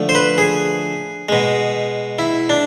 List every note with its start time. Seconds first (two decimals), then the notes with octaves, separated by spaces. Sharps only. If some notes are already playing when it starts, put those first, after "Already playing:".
Already playing: D3 F3 A3
0.09 C5
0.15 B4
0.38 G#4
1.29 B2 G#3
2.19 E4
2.50 D4